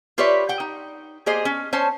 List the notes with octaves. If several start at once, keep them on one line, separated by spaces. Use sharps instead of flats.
F4 G4 B4 C#5 D5 E5
F#5 G5
D#4
A#3 G4 G#4 C5 D#5
C#4
C#4 C5 C#5 A5